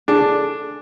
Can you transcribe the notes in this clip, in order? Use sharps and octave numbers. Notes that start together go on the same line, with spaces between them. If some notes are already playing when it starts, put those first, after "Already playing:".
D4 G#4 A4 A5